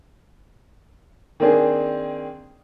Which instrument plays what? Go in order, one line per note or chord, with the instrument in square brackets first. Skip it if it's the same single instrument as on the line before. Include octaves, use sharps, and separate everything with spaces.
[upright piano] D#3 A#3 C4 D4 G#4